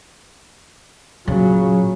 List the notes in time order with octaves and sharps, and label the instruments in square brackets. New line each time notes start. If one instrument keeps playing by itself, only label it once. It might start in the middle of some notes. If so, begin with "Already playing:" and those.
[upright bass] A#2 [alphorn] C#3 [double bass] F#3